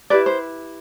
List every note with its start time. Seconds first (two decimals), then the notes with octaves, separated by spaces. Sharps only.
0.10 E4 G4 B4 D5
0.26 C5